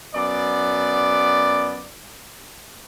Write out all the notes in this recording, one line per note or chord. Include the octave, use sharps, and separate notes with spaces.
F#2 B3 D5